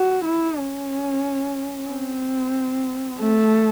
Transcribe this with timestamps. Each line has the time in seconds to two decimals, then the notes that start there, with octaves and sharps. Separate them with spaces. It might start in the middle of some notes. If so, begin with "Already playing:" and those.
Already playing: F#4
0.25 E4
0.58 C#4
1.89 C4
3.20 A3